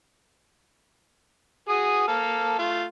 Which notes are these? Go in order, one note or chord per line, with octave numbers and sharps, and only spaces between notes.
F#4 G#4 D#6
A#3 A4 F6
A3 F4